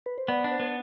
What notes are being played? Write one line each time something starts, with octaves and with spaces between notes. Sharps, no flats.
B4
C5
B3 D5
D4
C5
B3